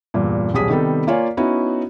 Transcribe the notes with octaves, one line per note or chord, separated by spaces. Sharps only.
E2 G2 A#2
D#1 B1 G3 G#4 D#6 B6
C3 D#3 G3 B3 A4
A#3 F4 C#5 D5 G#5
B3 C#4 D#4 E4 F#4